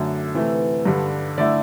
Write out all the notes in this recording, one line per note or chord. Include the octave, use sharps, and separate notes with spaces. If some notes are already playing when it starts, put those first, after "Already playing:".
Already playing: F#2 D3 A3
C3 E3 A3
G2 D3 G3
D3 A3 E4 D5